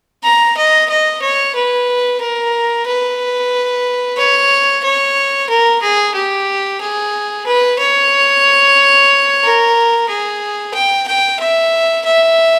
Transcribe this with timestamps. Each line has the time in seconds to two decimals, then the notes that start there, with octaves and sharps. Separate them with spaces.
0.24 A#5
0.57 D#5
0.90 D#5
1.22 C#5
1.55 B4
2.21 A#4
2.86 B4
4.17 C#5
4.84 C#5
5.49 A#4
5.82 G#4
6.14 G4
6.81 G#4
7.46 B4
7.79 C#5
9.43 A#4
10.09 G#4
10.74 G5
11.08 G5
11.40 E5
12.06 E5